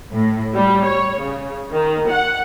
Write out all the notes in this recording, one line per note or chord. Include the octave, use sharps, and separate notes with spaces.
A2
G3
C#5
C#3
D#3
F#5